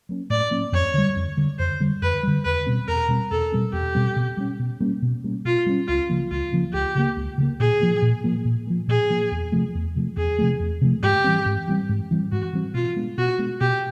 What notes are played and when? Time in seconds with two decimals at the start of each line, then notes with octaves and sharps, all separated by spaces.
0.09 F#3 A#3 C#4
0.30 A2 D5
0.51 F#3 A#3 C#4
0.72 F2 C#5
0.94 D3 G3
1.16 F2
1.37 D3 G3
1.58 F2 C5
1.80 D3 G3
2.02 F2 B4
2.23 D3 G3
2.44 E2 B4
2.66 B2 G3 C4
2.88 E2 A#4
3.08 B2 G3 C4
3.31 E2 A4
3.52 B2 G3 C4
3.73 E2 G4
3.95 B2 G3 C4
4.16 B2
4.37 G3 A#3 C#4
4.59 B2
4.80 G3 A#3 C#4
5.02 B2
5.24 G3 A#3 C#4
5.45 B2 F4
5.66 G3 A#3 C#4
5.87 C#2 F4
6.09 C#3 F3 A#3
6.31 C#2 F4
6.52 C#3 F3 A#3
6.73 C#2 G4
6.95 C#3 F3 A#3
7.17 C#2
7.38 C#3 F3
7.43 A#3
7.60 A#2 G#4
7.81 F3 A#3
8.02 A#2
8.24 F3 A#3
8.45 A#2
8.67 F3 A#3
8.88 A#2 G#4
9.10 F3 A#3
9.31 E2
9.52 C3 F3 A3
9.75 E2
9.96 C3 F3 A3
10.17 E2 G#4
10.39 C3 F3 A3
10.60 E2
10.81 C3 F3 A3
11.02 G#2 G4
11.24 E3 G3 C4
11.46 G#2
11.68 E3 G3 C4
11.89 G#2
12.11 E3 G3 C4
12.32 G#2 F#4
12.53 E3 G3 C4
12.74 B2 F4
12.96 G#3 B3 D4
13.18 B2 F#4
13.38 G#3 B3 D4
13.60 B2 G4